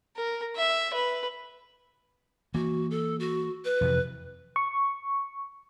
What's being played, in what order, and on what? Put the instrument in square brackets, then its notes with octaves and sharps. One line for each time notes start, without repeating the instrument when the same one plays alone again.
[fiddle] A#4
E5
B4
[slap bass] E3 A#3 [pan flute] F#4
[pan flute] A4
F#4
B4
[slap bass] F2 C3 E3
[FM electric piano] C#6